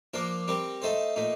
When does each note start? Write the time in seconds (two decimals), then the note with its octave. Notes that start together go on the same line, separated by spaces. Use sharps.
0.14 F3 A#3 D4 F4 A#4
0.48 G3 C4 G4 A#4
0.82 A3 D#4 A4 C5
1.16 A#2 A3 D#4